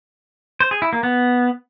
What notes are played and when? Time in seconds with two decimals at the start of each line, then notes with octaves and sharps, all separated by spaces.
0.60 C5
0.71 G#4
0.82 E4
0.93 A#3
1.03 B3